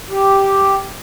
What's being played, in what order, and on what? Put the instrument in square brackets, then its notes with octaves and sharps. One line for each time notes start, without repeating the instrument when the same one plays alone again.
[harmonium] G4